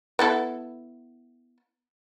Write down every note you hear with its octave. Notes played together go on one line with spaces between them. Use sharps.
B3 E4 A4